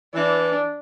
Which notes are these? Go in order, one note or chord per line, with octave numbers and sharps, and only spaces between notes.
E3 D4